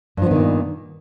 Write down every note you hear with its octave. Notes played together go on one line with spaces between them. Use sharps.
G2 A#2 D#3 F3 B3